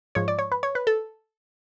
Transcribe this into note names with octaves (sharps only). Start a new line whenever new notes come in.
G#2 F3 C#5
D5
C#5
B4
C#5
B4
A4